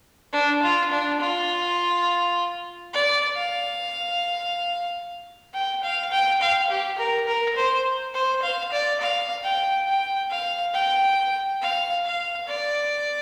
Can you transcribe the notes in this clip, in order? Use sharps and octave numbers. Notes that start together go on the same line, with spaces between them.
D4
F4
D4
F4
D5
F5
G5
F5
G5
F5
G4
A#4
A#4
C5
C5
F5
D5
F5
G5
G5
F5
G5
F5
F5
D5